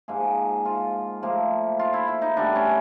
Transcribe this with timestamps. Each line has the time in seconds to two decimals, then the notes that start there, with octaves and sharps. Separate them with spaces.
0.08 G#2 F3 A#3 G#4
0.65 F4
1.23 A2 F3 A#3
1.79 F4
1.94 E4
2.08 E4
2.22 D#4
2.37 A2 E3 G3 B3 D4
2.56 C#4